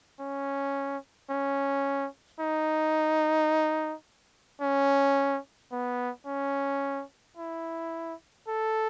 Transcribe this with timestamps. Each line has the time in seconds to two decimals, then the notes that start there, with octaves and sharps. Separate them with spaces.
0.20 C#4
1.30 C#4
2.40 D#4
4.61 C#4
5.72 B3
6.27 C#4
7.37 E4
8.48 A4